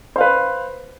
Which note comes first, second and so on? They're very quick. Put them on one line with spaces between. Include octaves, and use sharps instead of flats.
C5 F5 B4